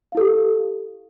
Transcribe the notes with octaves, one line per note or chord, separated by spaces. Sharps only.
E4 G4 A4 F5